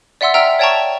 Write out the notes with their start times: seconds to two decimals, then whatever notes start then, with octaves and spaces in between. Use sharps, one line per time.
0.21 D5 E5 F#5 C6 E6
0.34 E5 G5 A#5 E6 F6
0.59 C#5 D5 G5 A5 A#5 C#6